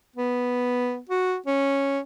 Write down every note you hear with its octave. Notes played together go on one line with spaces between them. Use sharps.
B3
F#4
C#4